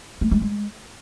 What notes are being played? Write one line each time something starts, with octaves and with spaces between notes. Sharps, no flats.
A3
G#3
G#3